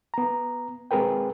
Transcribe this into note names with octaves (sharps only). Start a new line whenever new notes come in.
B3 A#5
G#3 C4 G#4 A#4 B4 G5